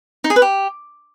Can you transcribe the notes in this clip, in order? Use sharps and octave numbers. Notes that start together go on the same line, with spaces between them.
D#4
G#4
B4
G4